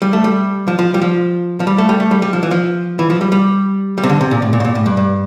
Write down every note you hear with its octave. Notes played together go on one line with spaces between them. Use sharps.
G3
A3
G3
F3
F3
G3
F3
F3
G3
A3
G3
A3
G3
G3
F3
E3
F3
E3
F3
G3
G3
G3
C3
D3
C3
A#2
A2
A#2
A2
A#2
A2
G2
G2